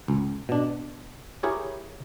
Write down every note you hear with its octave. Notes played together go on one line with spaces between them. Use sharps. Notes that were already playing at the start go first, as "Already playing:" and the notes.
C#2
B2 D4
E4 G4 G#4 A#4 C#5